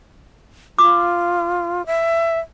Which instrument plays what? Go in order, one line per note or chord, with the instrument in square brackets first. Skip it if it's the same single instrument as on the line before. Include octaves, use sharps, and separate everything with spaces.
[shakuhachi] F4 [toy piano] D6
[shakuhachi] E5